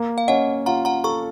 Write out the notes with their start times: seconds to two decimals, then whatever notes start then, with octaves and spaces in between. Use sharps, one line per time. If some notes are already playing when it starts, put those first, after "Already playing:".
Already playing: A#3
0.18 F5
0.28 C#4 D#5 F#5
0.66 F4 F#5 A#5
0.85 F#5 A#5
1.04 A4 A#5 C#6